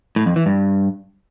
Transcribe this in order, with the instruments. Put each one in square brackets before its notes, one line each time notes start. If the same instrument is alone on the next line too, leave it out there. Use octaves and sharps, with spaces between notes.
[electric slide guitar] A2
F2
E3
G2